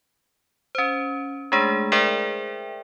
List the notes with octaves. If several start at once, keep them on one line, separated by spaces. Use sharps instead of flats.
C#4 C5
G#3 A3 D4 G#4
G#4 A#4 C5 D5 E5 G5